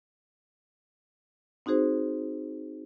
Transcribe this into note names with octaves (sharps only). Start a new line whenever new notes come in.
C4 D#4 F#4 G#4 C5